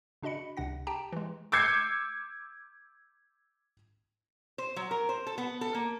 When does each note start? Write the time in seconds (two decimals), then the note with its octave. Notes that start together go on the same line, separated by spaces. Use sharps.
0.23 C#3 D4 F#4 D#5 B5 C#7
0.57 C#2 C3 D4 F#5 A#6
0.87 G4 G5 A5 A#5
1.12 E3 G#3
1.52 D6 E6 G6 G#6 C7 C#7
4.58 C5
4.76 F#3
4.91 A#4
5.09 C5
5.27 A4
5.38 B3
5.61 A4
5.75 A#3